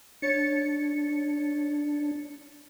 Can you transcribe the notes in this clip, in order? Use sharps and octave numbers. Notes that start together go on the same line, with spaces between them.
D4 C#5 A6 C#7